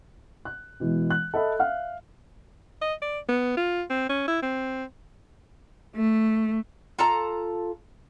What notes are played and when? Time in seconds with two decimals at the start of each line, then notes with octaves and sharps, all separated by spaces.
0.45 F#6
0.80 B2 E3 G#3
1.10 F#6
1.34 A4 D#5 E5 B5
1.60 E5 F5 F6
2.82 D#5
3.02 D5
3.29 B3
3.57 F4
3.90 C4
4.09 C#4
4.28 E4
4.43 C4
5.94 A3
6.99 F4 A4 A5 A#5